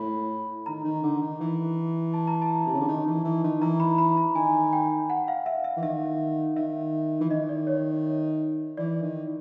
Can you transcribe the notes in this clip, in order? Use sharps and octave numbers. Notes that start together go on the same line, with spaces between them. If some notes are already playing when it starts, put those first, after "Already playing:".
Already playing: A2 B5
D#3 A#5
D#3
D3
D#3
E3
A5
A#5
A5
C3
C#3
D3
D#3
E3
E3
D#3
E3 A#5
B5
B5
A#5
D#3 G#5
G5
F#5
F5
E5
E5
E3
D#3 E5
D#3 E5
E3
D#3 D#5
D5
C#5
E3 D5
D#3